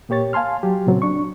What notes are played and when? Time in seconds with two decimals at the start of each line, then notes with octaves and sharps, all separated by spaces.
0.09 A#2 A#3 G4 C#5 A6
0.33 F5 G#5 A5 C6 F6
0.63 F#3 G4
0.87 A#2 C#3 F#3 C4
1.02 D4 C#6